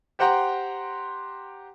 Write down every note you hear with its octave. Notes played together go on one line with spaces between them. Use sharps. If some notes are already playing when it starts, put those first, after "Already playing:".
G4 C5 F#5 G5 A#5 C6